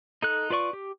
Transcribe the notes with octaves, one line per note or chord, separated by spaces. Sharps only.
D#4 A4 F#6
F4 B4 D5 C#6
G4